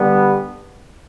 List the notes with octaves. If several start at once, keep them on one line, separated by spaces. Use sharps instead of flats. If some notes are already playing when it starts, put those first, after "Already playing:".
Already playing: D3 G3 B3